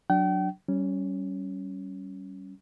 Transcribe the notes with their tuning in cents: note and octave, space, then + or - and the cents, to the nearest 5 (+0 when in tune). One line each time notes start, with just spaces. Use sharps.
F#3 +0 D4 +0 G5 -40
G3 -30 C#4 +0